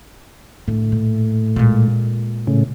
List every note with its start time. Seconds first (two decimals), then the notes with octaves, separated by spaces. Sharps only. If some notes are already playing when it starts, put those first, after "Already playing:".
0.68 A2 D3
0.92 A#2
1.56 A#2 G#3
2.47 A2 C#3